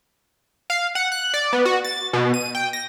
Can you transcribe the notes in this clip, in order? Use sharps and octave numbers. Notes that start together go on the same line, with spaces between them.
F5
F#5
F#6
D5
B3
F#4
A6
B2
D#7
G5
A#6